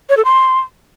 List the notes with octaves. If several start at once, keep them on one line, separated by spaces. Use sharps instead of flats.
C#5
A4
C6